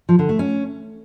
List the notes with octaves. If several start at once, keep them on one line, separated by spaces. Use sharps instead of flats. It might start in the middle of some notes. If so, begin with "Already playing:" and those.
F3
D3
A3
C#4